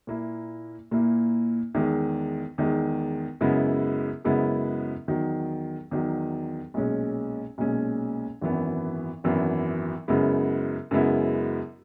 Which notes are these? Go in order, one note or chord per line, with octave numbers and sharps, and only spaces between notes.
A#2 A#3 E4
A#2 A#3 E4
E2 D#3 G#3
E2 D#3 G#3
F#2 C#3 G#3 B3 E4
F#2 C#3 G#3 B3 E4
E2 D#3 F#3
E2 D#3 F#3
B1 A#2 G#3 C#4
B1 A#2 G#3 C#4
G#1 F#2 E3 B3
G#1 F#2 E3 B3
F#2 C#3 G#3 B3 E4
F#2 C#3 G#3 B3 E4